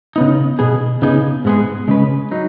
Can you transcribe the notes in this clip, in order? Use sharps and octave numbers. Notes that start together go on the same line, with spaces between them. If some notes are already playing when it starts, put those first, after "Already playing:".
C#3 B3 D#4
B2 B3 G#4
C#3 B3 D#4 G#4
G#2 G#3 B3 G#4
C#3 G#3 C#4 B4
F#3 D#4